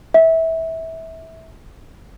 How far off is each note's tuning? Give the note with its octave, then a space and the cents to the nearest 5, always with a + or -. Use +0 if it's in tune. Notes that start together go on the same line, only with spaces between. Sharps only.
E5 -20